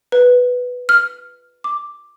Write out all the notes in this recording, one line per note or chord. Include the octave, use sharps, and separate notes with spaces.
B4
F6
D6